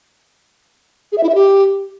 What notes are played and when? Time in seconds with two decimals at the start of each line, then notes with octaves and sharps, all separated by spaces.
1.12 G#4
1.18 E5
1.23 E4
1.29 E5
1.35 G4